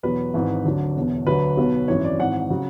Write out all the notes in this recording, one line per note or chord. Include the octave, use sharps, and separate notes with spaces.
E2 B2 F#3 B4
G#1 G#2 E3
D2 D3 F#3
E1 E2 B2
D2 D3 F#3 B4
B1 B2 F#3
G#1 F#2 E3 C#5
D5
G#1 G#2 E3 F#5
C#3 F#3